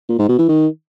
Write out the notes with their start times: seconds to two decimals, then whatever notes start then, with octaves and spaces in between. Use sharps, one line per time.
0.09 A#2
0.19 G#2
0.29 B2
0.39 E3
0.49 D#3